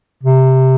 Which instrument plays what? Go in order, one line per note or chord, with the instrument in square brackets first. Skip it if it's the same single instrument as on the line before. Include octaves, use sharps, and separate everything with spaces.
[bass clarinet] C3